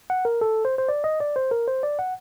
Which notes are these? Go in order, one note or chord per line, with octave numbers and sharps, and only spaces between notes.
F#5
A#4
A4
C5
C5
D5
D#5
D5
C5
A#4
C5
D5
F#5